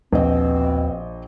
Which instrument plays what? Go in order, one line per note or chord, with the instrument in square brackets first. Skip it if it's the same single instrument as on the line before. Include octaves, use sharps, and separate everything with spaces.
[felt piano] A#1 D#5 [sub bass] D#2 [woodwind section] B2 C4